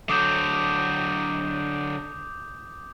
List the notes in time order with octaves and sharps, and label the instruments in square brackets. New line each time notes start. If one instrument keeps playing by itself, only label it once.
[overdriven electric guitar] D3 F#3 [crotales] D6 D#6 G6